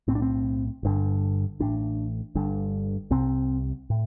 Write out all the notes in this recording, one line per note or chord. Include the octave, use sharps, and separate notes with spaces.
B1 A2 C4
D4
C4
G1 G2 D3
A1 A2 D4
G1 G2 D3
C2 C3 C4
A2